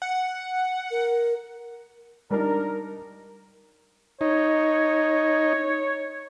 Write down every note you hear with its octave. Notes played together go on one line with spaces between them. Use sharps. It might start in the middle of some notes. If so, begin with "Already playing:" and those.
F#5
A#4
G3 D4 D#4 A#4
D#4 C#5